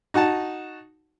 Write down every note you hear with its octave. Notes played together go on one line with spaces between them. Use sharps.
D#4 F#4 F#5 A5